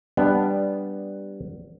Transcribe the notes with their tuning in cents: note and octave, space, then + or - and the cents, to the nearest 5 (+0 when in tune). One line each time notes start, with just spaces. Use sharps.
G3 +0 B3 +0 D4 +0